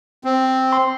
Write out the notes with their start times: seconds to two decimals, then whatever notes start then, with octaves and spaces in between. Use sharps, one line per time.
0.24 C4
0.72 C6